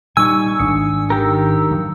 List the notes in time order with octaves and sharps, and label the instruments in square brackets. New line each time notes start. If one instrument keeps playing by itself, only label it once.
[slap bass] A#2 [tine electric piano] G3 D#4 [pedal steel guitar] G#5 C#6 [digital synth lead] E6
[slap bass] G#1 [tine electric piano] D4 D#6 C#7
[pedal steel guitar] D#3 G4 A#4
[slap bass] F3 F#3